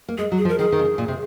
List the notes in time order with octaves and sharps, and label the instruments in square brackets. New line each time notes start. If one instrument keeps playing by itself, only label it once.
[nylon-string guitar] A#3
[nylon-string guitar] G#3 [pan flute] G#4
[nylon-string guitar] F#3
[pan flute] G#4
[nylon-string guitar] F3
[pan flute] A#4
[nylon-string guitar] D#3 [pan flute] G#4
[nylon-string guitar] D#3
C#3
A#2
C3